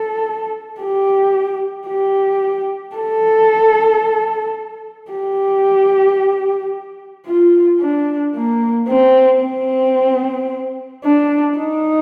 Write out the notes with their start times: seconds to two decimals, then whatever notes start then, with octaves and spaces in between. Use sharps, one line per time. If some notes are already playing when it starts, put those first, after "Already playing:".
Already playing: A4
0.81 G4
1.88 G4
2.96 A4
5.11 G4
7.26 F4
7.81 D4
8.35 A#3
8.88 C4
9.42 C4
11.04 D4
11.58 D#4